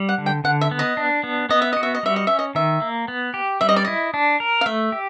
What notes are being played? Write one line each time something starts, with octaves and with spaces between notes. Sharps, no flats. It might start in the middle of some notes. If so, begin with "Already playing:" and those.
Already playing: G3
F#5
D3
G5
D3 F#5
E5
B3
D#5
D4
B3
B3 D#5
E5
F#4 D#5
E5
D#5
G3 E5
D#5
C#4 E5
D#5
D#3 E5
A#3
B3
G4
G3 E5
D#5
D5
E4 D#5
D4
A#4
F5
A3 E5
G4